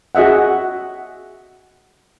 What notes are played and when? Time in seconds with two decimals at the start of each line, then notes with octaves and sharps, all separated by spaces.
0.15 F#4 G#4 D#5 E5 F#5